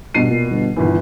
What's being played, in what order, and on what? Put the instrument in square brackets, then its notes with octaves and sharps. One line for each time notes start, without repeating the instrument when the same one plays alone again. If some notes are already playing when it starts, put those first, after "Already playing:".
[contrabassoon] G2 [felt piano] B2 C7 D#7
[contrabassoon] A#2
G1
[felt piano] G1 E3 [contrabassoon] D#2